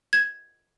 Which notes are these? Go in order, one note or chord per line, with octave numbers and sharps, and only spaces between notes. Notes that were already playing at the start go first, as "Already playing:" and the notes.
G#6